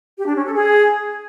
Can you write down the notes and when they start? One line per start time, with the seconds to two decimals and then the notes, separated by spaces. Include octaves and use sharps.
0.18 G4
0.27 D4
0.36 C#4
0.45 A4
0.54 G#4